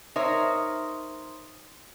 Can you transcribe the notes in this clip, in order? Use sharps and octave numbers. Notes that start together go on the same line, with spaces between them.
D#4 A#4 C5 C#5 E5